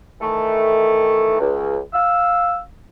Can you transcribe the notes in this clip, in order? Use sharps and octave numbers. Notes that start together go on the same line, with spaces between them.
D#3 E3 A3
C#2
F5 E6